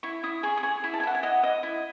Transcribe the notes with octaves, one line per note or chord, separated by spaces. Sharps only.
E4 C#6
E4 D#6
G#4 C#6
D#6
G#4 C#6
E4
A5
G#5
E4 F#5
G#5
D#5 F#5
D#5
E4